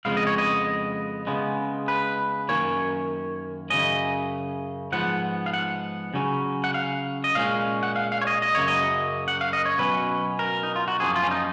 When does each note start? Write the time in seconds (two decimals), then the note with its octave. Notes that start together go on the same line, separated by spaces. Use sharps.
0.05 F2 C#3 G#3 B3 F5
0.17 D#5
0.27 C#5
0.38 D#5
1.27 C#3 G#3 B3
1.88 B4
2.48 F#2 D#3 A#3 C#4 C#5
3.70 F#2 C#3 G#3 C#4 D#5
4.92 G#2 F3 B3 F#5
5.46 F5
5.53 F#5
6.14 C#3 F#3 C#4
6.64 F#5
6.74 F5
7.24 D#5
7.35 A#2 G#3 C#4 F5
7.83 F#5
7.96 F5
8.12 F5
8.21 C#5
8.27 D#5
8.42 D#5
8.55 F#2 C#3 F#3 A#3 C#5
8.68 D#5
9.28 F#5
9.41 F5
9.53 D#5
9.66 C#5
9.78 B2 F#3 C#4 B4
10.39 A#4
10.63 D#4
10.76 F4
10.88 F#4
11.00 F#2 F3 A#3 C#4 G#4
11.16 F4
11.23 C#4
11.31 D#4